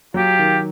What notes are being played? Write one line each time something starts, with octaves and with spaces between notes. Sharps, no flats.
F#3 F4 G4
D#3